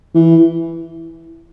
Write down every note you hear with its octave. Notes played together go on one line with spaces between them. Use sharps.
E3